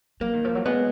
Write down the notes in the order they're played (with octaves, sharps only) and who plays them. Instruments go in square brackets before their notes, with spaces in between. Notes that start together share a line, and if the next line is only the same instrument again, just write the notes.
[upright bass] F#3 [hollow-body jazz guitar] A#3
[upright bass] D#3
F3
F#3
[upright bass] G#3 [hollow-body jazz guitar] B3